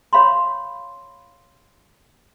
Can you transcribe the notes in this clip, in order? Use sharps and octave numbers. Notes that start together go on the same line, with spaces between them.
C#5 F5 B5 C6